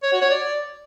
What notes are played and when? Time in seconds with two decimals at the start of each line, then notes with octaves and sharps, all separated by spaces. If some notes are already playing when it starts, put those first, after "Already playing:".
0.03 C#5
0.12 F#4
0.21 C#5
0.31 D5